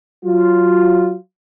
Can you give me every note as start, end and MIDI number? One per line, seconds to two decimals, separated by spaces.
0.24 1.15 54
0.24 1.15 65